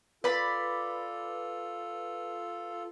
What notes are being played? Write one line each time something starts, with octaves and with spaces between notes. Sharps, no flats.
F4 A4 B4 D5 B5